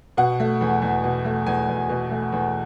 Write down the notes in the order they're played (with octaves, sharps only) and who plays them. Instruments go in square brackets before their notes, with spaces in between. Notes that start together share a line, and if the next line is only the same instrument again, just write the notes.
[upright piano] B2 F#5
A3
E2
E2
B2
A3
E2 G#5
E2
B2
A3
E2